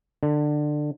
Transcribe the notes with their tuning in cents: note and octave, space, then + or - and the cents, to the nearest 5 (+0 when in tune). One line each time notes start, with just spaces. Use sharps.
D3 +20